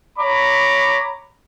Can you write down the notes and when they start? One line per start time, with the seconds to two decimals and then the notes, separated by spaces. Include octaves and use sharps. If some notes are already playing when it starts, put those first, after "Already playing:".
0.19 C#5 A#5 B5 D6